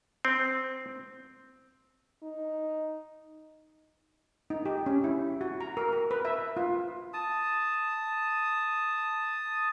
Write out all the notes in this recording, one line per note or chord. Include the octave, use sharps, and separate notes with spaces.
C4
D#4
D#4
G4
C#4
E4
F#4
A#5
A#4
A#4
B4
E5
F4
A5 D#6